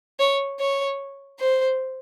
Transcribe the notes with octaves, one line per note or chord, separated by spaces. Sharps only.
C#5
C#5
C5